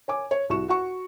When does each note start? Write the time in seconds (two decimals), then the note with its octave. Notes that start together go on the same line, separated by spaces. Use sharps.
0.08 C#5 G#5 D6
0.31 C#5
0.49 C2 F#4 C#6 E7
0.68 F#4 F#5 C#6